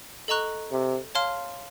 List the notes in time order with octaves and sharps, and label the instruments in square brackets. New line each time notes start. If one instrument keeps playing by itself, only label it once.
[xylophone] A4 D#5 A#5 C#6 F#6
[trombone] C3
[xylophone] C#5 F5 A5 C6 F6